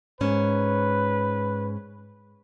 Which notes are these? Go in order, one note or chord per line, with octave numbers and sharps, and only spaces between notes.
G#2 C#4 B4